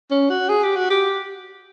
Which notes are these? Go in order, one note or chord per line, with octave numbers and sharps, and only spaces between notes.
C#4
F#4
G#4
G4
F#4
G4